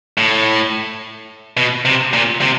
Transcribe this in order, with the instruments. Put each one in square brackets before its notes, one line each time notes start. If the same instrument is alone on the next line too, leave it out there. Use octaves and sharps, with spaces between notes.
[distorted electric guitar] A2
B2
C3
A#2
C3